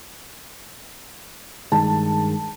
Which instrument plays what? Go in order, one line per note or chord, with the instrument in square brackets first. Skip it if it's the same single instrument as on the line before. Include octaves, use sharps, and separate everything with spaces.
[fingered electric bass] G2 D#3 G#3 [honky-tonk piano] A5